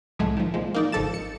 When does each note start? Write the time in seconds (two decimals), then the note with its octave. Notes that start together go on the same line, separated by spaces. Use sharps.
0.19 C2 A2 F#3 G#3 A3
0.37 D#3 F3
0.54 A#2 F3 G#3
0.75 A#3 D#4 D5
0.92 G#1 C#3 F3 A4 A6 E7
1.14 C#7